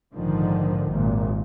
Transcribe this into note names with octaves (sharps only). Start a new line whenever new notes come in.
A#1 G#2 D3 D#3 F3
G#1 D#2 A#2